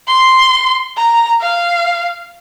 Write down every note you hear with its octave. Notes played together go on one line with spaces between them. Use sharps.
C6
A#5
F5